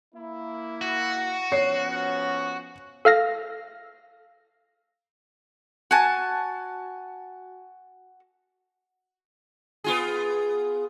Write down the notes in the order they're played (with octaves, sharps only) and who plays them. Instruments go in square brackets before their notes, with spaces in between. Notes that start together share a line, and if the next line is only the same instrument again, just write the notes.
[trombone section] A#3 E4
[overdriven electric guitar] F#4
[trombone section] F3 B3 C#4 [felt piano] C#5 C7
[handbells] A4 F5 F6 A#6
[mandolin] F#4 G#5 A5
[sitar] B3 F4 G#4